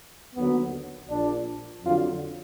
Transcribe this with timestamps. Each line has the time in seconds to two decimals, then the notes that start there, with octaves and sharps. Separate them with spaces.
0.36 D#2 D3 F#3 B3
1.09 A#1 A#2 F3 D4
1.83 F2 D3 F#3 F4